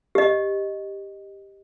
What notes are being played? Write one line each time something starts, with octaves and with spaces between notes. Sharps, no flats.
G4 D#5